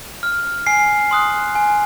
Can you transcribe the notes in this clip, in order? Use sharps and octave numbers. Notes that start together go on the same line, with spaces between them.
F6
G#5 C7
C6 D#6 F#6
G#5